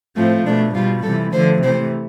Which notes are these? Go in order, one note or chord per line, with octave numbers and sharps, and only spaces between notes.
A2 F3 A3 C4
B2 A3 D4
B2 G3 F4
C3 E3 G3 A4
D3 F3 A3 C5
C3 E3 A3 C5